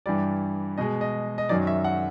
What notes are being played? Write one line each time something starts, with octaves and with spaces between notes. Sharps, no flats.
G2 E3 G3 D5
B2 G#3 D#5
D#5
D#5
F#2 D#3 F#3 D5
E5
F#5